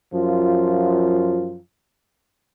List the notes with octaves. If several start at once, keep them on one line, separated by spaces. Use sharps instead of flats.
F#2 F3 F4